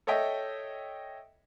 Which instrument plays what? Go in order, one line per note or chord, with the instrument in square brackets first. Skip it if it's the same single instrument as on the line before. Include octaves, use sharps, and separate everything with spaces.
[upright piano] A4 C#5 D#5 E5 G5